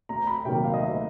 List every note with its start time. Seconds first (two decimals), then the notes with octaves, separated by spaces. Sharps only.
0.09 D2 A#5
0.27 B5
0.45 C3 D#3 F#3 A#3 G5
0.64 F5
0.74 D#5
0.82 D2 E5